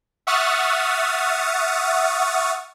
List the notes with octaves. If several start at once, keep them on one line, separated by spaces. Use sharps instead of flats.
E5 F#5 C#6 D#6 F6 A6